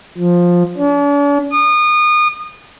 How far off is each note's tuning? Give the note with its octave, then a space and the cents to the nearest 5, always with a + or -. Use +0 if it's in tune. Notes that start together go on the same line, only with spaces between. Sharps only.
F3 +10
D4 -45
D#6 -30